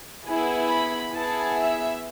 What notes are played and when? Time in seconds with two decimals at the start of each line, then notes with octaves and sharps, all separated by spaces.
0.26 B3 E4 G#4
0.71 B5
1.14 B3 E4 G#4 A5
1.57 E5